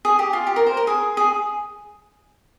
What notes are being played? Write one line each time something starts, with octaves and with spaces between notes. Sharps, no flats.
G#4
G4
F4
G4
A#4
C5
A#4
G#4
G#4